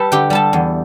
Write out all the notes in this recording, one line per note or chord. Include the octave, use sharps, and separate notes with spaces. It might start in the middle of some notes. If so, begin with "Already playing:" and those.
Already playing: G3 A4 B4 A5
D3 G4 G5
G3 A4 A5
E2